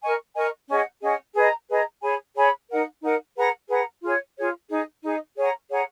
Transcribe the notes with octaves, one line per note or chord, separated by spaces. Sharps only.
A#4 D#5 G#5 C#6
A#4 D#5 G#5 C#6
C#4 G#4 D#5 F#5
C#4 G#4 D#5 F#5
G#4 B4 D#5 A#5
G#4 B4 D#5 A#5
G#4 C#5 G#5 B5
G#4 C#5 G#5 B5
D#4 A#4 D#5 F#5
D#4 A#4 D#5 F#5
G#4 B4 F#5 A#5
G#4 B4 F#5 A#5
F4 G#4 C#5
F4 G#4 C#5
D#4 G#4 D#5
D#4 G#4 D#5
G#4 C#5 F#5 A#5
G#4 C#5 F#5 A#5